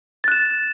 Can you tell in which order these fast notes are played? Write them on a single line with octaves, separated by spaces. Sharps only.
A6 F#6 E7